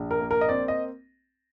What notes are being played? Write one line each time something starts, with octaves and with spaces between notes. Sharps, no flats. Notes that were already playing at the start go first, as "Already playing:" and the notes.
Already playing: A#1
A#4
A#3
A#4
D#5
C4 D5
D#5